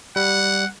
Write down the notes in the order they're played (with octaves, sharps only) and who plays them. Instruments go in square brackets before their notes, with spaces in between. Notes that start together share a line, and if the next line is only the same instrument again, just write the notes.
[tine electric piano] G3 [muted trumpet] F#5